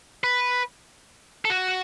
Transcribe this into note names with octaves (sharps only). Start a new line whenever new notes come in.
B4
A4
F#4